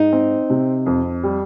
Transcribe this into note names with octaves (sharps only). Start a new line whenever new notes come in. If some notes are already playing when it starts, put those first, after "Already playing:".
Already playing: G#2 D#4
C4
C3
F2
G3